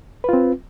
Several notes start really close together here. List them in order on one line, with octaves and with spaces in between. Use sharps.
B4 F4 C4